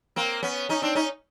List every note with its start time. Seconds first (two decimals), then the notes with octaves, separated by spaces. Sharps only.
0.16 A#3 C4
0.43 B3 C#4
0.69 C#4 D#4
0.82 C4 D4
0.95 C#4 D#4